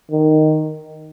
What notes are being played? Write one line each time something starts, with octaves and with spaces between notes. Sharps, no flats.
D#3